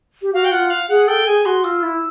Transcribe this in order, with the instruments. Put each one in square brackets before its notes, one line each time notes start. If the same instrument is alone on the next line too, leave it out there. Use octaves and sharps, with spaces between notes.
[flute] G4
[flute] F#4 [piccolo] F5
[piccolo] G5
[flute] F4 [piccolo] F#5
[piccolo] F5
[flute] G#4 [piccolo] F#5
[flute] A4 [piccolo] G5
[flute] G#4 [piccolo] G#5
[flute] F#4 [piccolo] C6
[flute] F4 [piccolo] E6
[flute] E4